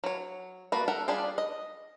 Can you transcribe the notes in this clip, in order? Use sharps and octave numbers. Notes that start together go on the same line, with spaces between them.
F#3 C#5
A#3 F#4 A4 B4
A4 A#4 E5 F#5
G3 D4 F4 G#4
D#5